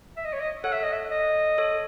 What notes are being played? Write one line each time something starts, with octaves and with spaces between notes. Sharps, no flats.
E5
D#5
C#5
D#5
A4 C#5 F#5
E5
D#5
E5
D#5
A4 C#5